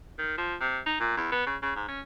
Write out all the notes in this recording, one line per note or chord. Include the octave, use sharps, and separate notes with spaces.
D#3
F3
C3
D#4
A#2
E2
B3
C#3
C#3
G#2
C#4